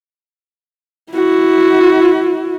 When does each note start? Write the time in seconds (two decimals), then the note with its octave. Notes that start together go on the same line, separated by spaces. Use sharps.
1.12 E4 F#4